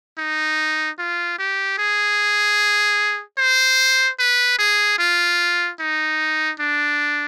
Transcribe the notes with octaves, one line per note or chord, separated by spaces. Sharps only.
D#4
F4
G4
G#4
C5
B4
G#4
F4
D#4
D4